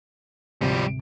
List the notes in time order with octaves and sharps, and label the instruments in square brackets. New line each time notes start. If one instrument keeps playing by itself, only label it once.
[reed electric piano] D2 G#2 C3 [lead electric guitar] F3 G3